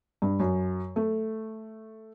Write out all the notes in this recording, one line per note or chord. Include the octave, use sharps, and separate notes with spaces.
G2
F#2
A3